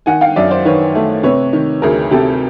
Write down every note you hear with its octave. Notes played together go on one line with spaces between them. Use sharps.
D#3 F#5 G#5
F5 G5
F#2 D5 E5
C5 D5
D#3 B4 C#5
A3
C3 B4 C#5
D#3
D2 G#4 A#4
C3 G4 A4